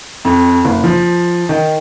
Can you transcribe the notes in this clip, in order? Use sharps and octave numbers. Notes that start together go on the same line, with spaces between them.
F2
F#1
F3
D#3